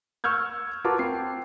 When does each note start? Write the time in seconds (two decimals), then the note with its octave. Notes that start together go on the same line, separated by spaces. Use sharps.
0.24 C#6 E6 F6 G6 G#6
0.84 F4 F#4 A#4 B4 A5 D6
0.99 C4 C7